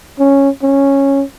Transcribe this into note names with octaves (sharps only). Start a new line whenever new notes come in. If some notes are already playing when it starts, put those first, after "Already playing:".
C#4
C#4